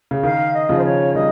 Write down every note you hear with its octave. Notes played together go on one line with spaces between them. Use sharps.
C#3
D#3 F5
D#5
C#3 F3
C5
C#5
D#3 G3 D#5